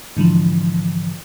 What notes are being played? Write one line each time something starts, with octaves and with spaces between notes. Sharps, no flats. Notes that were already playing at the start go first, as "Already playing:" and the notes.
G#2 D3 E3 F3